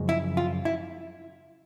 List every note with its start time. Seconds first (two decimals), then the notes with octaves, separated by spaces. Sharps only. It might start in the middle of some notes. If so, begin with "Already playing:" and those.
Already playing: F#2 C#3 F3 G#3
0.09 E4
0.37 F4
0.65 E4